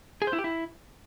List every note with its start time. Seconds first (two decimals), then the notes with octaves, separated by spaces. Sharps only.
0.22 G#4
0.27 C5
0.33 E4
0.39 G4
0.44 E4